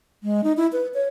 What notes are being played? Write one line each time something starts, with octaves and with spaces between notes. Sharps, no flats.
G#3
D#4
E4
B4
C#5